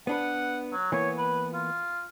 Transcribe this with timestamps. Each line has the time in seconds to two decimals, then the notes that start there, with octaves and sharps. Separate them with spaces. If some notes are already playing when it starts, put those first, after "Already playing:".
0.07 B3 D4 B4 F#5
0.72 F#3
0.92 E3 A#3 B3 C#5
1.18 B4
1.53 F4